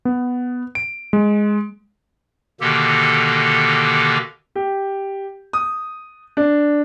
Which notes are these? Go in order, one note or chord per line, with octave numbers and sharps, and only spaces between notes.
B3
D7
G#3
B2 D3 D#3 A#3 G4 A4
G4
D#6
D4